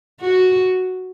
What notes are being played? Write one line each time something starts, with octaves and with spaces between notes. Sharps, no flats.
F#4